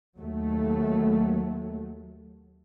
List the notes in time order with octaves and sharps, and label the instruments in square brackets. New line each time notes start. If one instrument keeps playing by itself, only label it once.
[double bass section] D#2 F#3 A3